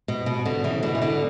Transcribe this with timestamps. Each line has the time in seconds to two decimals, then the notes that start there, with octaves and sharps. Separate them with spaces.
0.08 B2
0.26 B2
0.45 B2 D3
0.64 C#3 E3
0.83 B2 D3
0.95 E3
1.02 B2 D3